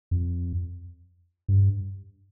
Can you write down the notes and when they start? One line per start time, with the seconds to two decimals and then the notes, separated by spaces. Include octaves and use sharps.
0.11 F2
1.48 G2